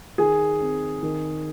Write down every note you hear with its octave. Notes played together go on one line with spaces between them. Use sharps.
D#3 G#4 G#5
C4
D#3